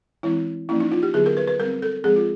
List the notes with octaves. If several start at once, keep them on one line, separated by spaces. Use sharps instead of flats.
E3 G#3 C4 E4
F3 A#3 C#4 E4
D#4
F4
G4
D3 F#3 B3 G#4
A#4
B4
B4
G3 C4 A#4
A4
F3 G#3 C4 G#4
F4